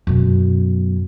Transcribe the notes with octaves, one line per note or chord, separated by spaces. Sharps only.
F#2 B2